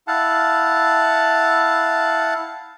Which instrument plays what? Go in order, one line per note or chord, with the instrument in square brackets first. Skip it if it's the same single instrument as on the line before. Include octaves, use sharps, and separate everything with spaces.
[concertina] E4 F5 F#5 A5